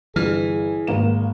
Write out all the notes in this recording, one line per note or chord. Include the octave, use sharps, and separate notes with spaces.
G1 E3 G#4 F6
G#1 A#3 E7